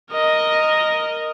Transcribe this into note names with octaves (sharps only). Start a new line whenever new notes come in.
A#4 D#5